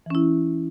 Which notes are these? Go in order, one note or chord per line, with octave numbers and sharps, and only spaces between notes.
E3 C#4 E4